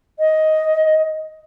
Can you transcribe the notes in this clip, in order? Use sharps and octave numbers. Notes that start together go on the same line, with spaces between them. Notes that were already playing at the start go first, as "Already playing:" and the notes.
D#5